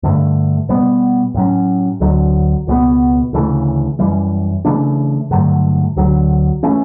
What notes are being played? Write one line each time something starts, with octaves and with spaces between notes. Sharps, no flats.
G2 D3 A3
B2 G3 B3
A2 F#3 C#4
D2 D3 F#3
C#2 B2 G3 B3
D2 C#3 E3 A3
F#2 E3 G3
C#3 E3 A3 D4
G2 D3 F#3 A3
D2 D3 F#3
E3 A3 C#4